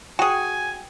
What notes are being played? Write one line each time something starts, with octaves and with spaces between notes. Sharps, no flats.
F#4 G#4 G5 G#5